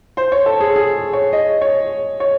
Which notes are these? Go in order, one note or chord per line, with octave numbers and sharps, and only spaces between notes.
C5
C#5
A4
G#4
G#4
C#5
D#5
C#5
C#5